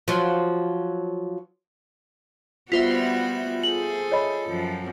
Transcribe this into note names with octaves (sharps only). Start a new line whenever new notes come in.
F3 F#3
G3 B3 F4 F#4 C5 E5 B6
G#4 A4 F#7
C#5 D#5 B5
F#2 F3